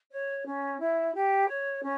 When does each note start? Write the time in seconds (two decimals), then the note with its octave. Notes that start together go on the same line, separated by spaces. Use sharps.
0.11 C#5
0.46 C#4
0.80 E4
1.14 G4
1.48 C#5
1.83 C#4